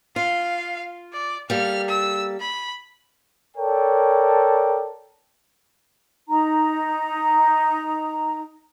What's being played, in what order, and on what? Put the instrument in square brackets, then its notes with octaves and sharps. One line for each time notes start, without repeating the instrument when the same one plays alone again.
[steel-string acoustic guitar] F4 [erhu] F5
[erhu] D5
[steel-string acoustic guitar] G3 A#3 A4 [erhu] F6
[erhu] E6
B5
[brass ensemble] A4 A#4 C#5 D5 G5
[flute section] D#4 A#5